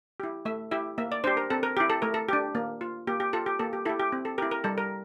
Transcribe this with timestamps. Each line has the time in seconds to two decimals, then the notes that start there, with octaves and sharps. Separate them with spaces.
0.20 E4 G4
0.45 A3 E5
0.71 E4 G4 E5
0.98 A#3 E5
1.12 D5
1.24 D4 G4 C5
1.37 A#4
1.50 C4 A4
1.63 A#4
1.77 E4 G4
1.90 A4
2.02 A3 A#4
2.14 A4
2.28 D4 G4
2.55 A#3
2.81 F4
3.07 A#3 G4
3.20 G4
3.33 F4 A4
3.46 G4
3.59 A#3 A4
3.73 G4
3.85 E4 G4 A4
4.00 G4
4.12 C4
4.25 A4
4.38 E4 G4 A#4
4.51 A#4
4.64 G3 A4
4.78 A#4